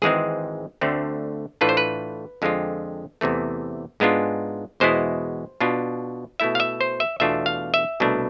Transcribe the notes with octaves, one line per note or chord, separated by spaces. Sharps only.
G#1 G#2 E3 G#3 C4 G#4
D2 D3 A3 C4
A2 E3 A3 D4 F4 B4
C5
B4
F2 D3 G#3 C4 F4
E2 C3 E3 A3
G#2 G#3 B3 D4 F4
E2 B2 G#3 B3 E4 C5
B2 B3 D4 F4
B2 A3 E4 E5
F5
E5
C5
E5
E2 B2 A3 D4 F4 E5
F5
E5
C2 B2 A3 D4